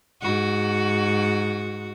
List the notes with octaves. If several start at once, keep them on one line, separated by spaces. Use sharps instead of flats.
G#2 F#4